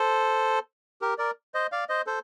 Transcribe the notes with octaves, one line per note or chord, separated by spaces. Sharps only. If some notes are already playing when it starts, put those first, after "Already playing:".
Already playing: A4 C5
G4 A#4
A#4 D5
C5 D#5
D5 F5
C5 D#5
A4 C5